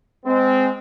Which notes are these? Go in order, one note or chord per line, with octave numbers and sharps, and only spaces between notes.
G#3 C4